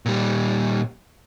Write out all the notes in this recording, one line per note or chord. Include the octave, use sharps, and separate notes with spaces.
A#2 G3